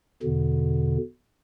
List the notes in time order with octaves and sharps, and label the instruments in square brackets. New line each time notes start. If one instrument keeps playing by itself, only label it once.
[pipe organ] E2 B2 D3